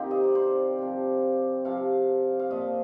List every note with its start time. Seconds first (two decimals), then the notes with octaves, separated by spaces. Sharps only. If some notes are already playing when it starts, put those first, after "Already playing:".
Already playing: C3 D#3 C4 D#4 F4 G4
0.11 D#5
0.24 D5
0.35 C5
0.79 C3 F3
1.65 C3 F3 F5
2.39 F5
2.51 A#2 F3 D#5